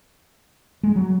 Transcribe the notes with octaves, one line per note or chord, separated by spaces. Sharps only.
G#3
F#3